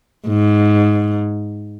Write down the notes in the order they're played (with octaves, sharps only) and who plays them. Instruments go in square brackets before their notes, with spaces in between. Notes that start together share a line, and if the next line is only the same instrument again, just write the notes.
[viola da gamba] G#2